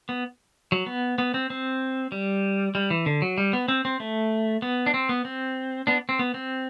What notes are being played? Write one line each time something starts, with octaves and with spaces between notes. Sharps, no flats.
B3
F#3
B3
B3
C4
C4
G3
G3
E3
D3
F#3
G3
B3
C4
C4
A3
B3
D4
C4
B3
C4
B3 D4
C4
B3
C4